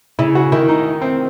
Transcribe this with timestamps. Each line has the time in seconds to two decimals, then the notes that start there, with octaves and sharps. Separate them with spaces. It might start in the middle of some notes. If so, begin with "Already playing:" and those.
0.19 C#3 E4
0.35 F#4
0.52 D#3 E4
0.68 D#4
1.02 C4